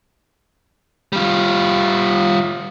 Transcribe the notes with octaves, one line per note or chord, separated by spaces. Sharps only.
G3 F4